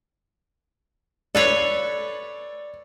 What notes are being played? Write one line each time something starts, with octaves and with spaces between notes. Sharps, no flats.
A4 B4 C#5 D5